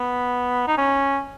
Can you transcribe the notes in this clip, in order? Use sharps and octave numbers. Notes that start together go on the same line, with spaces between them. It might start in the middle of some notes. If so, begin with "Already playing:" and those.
Already playing: B3
D#4
C#4